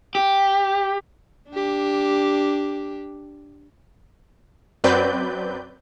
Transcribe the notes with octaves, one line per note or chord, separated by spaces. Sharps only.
G4
D4 G4
F#2 F#3 C4 B4 D5 G6